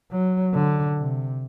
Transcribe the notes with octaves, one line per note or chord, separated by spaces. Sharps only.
F#3
D3
C3